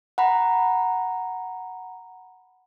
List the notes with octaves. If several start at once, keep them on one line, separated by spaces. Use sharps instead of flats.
F#5 A#5 B5